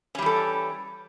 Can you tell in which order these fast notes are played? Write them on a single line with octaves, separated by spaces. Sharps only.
C#4 G3 E3 A4